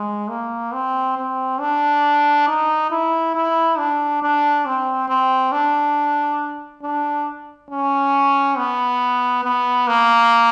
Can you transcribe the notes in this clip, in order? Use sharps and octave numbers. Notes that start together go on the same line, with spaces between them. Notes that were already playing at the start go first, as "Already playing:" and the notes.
Already playing: G#3
A#3
C4
C4
D4
D#4
E4
E4
D4
D4
C4
C4
D4
D4
C#4
B3
B3
A#3